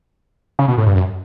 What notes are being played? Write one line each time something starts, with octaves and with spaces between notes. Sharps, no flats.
C#3
B2
A2
G2
F#2